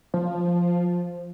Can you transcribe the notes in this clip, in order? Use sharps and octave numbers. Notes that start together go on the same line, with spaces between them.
F3